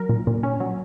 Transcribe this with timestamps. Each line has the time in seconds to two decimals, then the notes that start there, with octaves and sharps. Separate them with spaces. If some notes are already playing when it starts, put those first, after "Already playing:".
Already playing: F#3 A#4
0.09 A#2
0.27 A#2
0.43 C#4
0.60 F#3